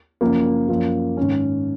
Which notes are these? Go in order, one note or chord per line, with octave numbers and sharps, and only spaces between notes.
F#2 C#3 F3 A#3
F#2 F3 A#3
G#2 D#3 C#4